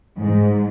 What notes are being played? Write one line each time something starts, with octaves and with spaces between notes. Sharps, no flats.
G#2